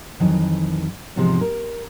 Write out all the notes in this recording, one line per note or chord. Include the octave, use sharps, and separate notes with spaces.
F2 D#3 E3 F#3
E2 G#2 C3 F3 G#3
A#4